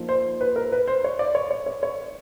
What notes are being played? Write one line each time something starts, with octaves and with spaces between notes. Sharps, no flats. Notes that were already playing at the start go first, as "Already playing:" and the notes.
Already playing: F3 A#3 D#4
C5
B4
A#4
B4
C5
C#5
D5
C#5
C#5
C#5
C#5